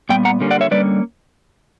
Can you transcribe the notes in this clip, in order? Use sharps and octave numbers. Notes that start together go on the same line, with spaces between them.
A#2 G3 B3 G5
F#5 A#5
D3 G3 A#3 C#4
D5 F#5
C#5 E5
D3 G3 A#3 C#4 B4 D5